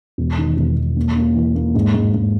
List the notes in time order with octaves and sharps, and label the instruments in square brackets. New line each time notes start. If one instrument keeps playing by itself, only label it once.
[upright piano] E1
D#3
E1
E1
A#3
A#3
E3
A#3
G#2
G#2
G#2